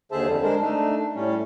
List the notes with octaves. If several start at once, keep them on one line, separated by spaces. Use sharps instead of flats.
D#2 D3 G#4 C5 E5 A5
F2 D3 G3
G#3 D4 A#4 C5
A3 D4 D#4
A2 G3 C#4